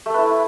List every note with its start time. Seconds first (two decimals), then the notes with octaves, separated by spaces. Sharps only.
0.06 A3
0.10 A4
0.14 B4
0.18 E4